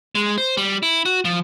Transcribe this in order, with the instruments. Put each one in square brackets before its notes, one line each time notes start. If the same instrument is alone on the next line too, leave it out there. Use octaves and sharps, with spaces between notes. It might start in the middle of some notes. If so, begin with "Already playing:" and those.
[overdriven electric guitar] G#3
C5
G3
E4
F#4
F3